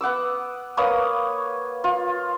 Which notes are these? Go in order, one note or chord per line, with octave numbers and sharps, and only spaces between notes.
B3 F#5 D6 E6
A#3 B4 C#5 D#6
F4